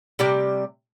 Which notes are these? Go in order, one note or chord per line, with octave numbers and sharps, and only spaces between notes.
C3 G3 G4